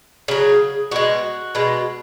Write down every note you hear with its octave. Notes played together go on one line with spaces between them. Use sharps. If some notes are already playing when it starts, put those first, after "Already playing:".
C#3 F#3 G#4
B2 G#3 F#4
B2 G#3